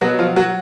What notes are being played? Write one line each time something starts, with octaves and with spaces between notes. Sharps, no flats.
B2 F#3 F#4
F3 F4
F#3 F#4